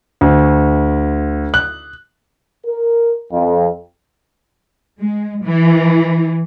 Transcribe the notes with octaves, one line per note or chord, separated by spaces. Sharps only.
D2
F#6
A#4
F2
G#3
E3